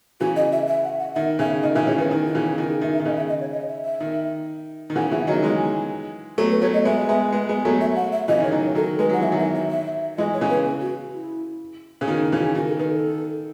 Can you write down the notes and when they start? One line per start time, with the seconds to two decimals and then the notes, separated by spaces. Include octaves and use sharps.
0.20 C#3 E3 F#4
0.36 D#5
0.52 E5
0.68 E5
0.84 F#5
0.99 F#5
1.15 D#3 E5
1.39 C#3 E5
1.62 D#3 D#5
1.75 C#3 E3 E5
1.86 C#3 E3 C#5
1.98 D#3 B4
2.11 D#3 D#4
2.26 E4
2.35 C#3 E3
2.58 D#3 E4
2.70 G#4
2.81 D#3 E5
2.94 E5
3.00 D#3
3.05 C#3 D#5
3.17 E5
3.29 D#5
3.41 C#5
3.53 D#5
3.69 E5
3.85 E5
4.00 D#3
4.90 D#3
4.96 C#3 E3 F#5
5.12 C#3 E3 E5
5.27 D#3 F#3 D#5
5.42 E3 G#3
6.38 F#3 A3 A4
6.51 B4
6.62 F#3 A3 C#5
6.73 D#5
6.85 G#3 B3 E5
7.09 G#3 B3
7.32 G#3 B3
7.49 G#3 B3
7.65 F#3 A3
7.81 E5
7.96 F#5
8.12 E5
8.28 C#3 E3 D#5
8.40 D#3
8.44 C#5
8.52 D#3 F#3
8.75 D#3 F#3 A4
8.99 G#3 B4
9.09 F#3 F#5
9.20 E3 E5
9.32 D#3 F#3
9.39 E5
9.55 E5
9.71 E5
10.17 E3 G#3 D#5
10.34 C#5
10.41 C#3 E3
10.50 B4
10.66 G#4
10.81 F#4
11.13 E4
12.01 C#3
12.08 D#3 F#4
12.24 E4
12.32 C#3 E3
12.39 F#4
12.55 D#3 F#4
12.68 A4
12.79 D#3 B4
12.91 A4